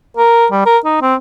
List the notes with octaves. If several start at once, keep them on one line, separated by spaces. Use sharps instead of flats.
A#4
G3
A#4
D#4
C4